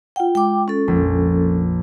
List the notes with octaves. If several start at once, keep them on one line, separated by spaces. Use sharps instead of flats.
F4 F#5 G5
G#3 G5 D6
C#4 A4
A#1 F2 A#2